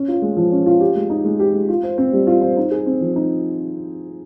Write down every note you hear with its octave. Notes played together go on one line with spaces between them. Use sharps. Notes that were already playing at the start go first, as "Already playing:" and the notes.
Already playing: C#4
F4
G#3
F3
C#4
F4
G4
G#3
D#4
G#3
G4
G#3
F4
C5
C4
G3
F4
C5
D#4
G#4
C4
F3
D#4